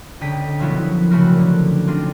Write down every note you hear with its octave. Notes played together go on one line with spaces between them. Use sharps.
C#2 D3 G5 D#6 B6
B2 F3 F#3 A#3 B3 E4
C#3 A3 C4 F#4 A#4 B4
D3
C4 D4 D#4 F4